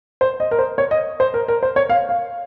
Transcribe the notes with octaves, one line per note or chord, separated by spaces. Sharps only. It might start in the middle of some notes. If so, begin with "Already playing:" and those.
C5
D#5
A#4
C5
C#5
D#5
C5
A#4
A#4
C5
C#5
F5
F5